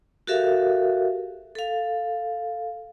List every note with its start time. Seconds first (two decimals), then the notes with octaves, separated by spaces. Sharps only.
0.27 F#4 G4 A4 A#4 E5 F5
1.55 A4 F5